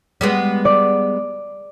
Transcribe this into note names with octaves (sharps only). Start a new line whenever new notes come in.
G3 G#3 B3
D5